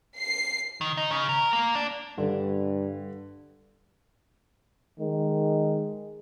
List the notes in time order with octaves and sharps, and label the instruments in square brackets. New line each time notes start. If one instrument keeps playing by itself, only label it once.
[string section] C7
[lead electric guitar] D#3
D#4
C#3
A#4
A#3
D4
[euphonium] G2 [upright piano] D3
[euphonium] D#3 [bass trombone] G#3